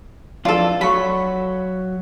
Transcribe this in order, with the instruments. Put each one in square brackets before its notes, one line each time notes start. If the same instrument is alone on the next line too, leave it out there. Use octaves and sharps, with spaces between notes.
[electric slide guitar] F2 E3 D4 [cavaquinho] F4 A4
[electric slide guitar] F#3 [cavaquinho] B5 C#6